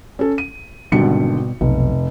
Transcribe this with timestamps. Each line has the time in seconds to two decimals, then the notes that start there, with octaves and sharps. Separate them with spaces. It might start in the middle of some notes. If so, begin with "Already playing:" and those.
0.19 C#4 A4
0.38 D#7
0.92 G#1 B2 D3 G3 C#7
1.61 F1 B1